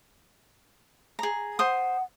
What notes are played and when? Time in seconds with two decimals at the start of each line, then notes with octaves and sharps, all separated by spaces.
1.19 G#4 A#5
1.59 C5 F#5 D#6